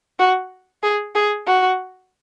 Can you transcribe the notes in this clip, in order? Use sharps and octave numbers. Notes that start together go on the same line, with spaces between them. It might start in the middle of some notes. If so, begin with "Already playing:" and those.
F#4
G#4
G#4
F#4